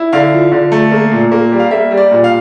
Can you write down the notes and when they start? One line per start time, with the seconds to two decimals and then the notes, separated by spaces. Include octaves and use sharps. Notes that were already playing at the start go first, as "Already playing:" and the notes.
Already playing: E4
0.13 D3 F5
0.32 F3
0.52 D3
0.72 A3
0.92 A#3
1.11 A#2
1.32 A#3
1.52 G3
1.59 F5
1.71 A#3 E5
1.91 G3
1.97 D5
2.11 A#2
2.24 F5